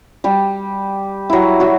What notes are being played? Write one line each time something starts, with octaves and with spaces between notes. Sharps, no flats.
G3 G4
F#3 E4 F#4
F#3 F#4